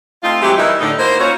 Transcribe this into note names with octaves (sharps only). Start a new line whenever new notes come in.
A3 C4 D#4 F4
F#3 G#3 C4 E4 G4
D#3 E3 G3 A#3 D#4 E4
A2 D3 D#4
A#3 E4 F#4 C5
C#4 D#4 F4 F#4 C#5